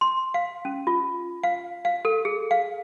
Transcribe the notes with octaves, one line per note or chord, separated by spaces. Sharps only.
C6
F5
C#4
F4
F5
F5
A4
G#4
F5